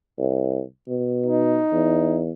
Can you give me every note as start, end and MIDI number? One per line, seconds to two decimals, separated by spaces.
0.18 0.62 36
0.88 1.60 47
1.26 2.21 63
1.73 2.30 40